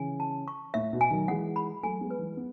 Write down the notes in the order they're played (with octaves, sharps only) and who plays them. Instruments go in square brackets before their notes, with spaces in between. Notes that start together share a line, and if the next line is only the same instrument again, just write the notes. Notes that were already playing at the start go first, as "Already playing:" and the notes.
Already playing: [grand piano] C#3 E3 [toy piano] G#5
[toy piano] A5
C#6
[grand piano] A2 [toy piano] E5
[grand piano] B2
[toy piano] G#5
[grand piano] D#3 F#3
[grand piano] E3 G#3 [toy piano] F#5
[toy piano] B5
[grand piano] F#3 A3 [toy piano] G#5
[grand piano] G#3 B3
[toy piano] B4
[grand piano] E3 G#3
B3